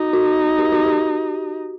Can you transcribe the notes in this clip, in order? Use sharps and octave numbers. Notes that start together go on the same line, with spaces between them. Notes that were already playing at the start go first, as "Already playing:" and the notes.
Already playing: D#4 F#4
F#4
G4
F#4
G4